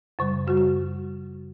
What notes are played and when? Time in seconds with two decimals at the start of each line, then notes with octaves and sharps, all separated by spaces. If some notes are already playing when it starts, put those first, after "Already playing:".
0.19 F#2 C#3 G3
0.47 F#2 C#3 G3 F#4
0.57 F#4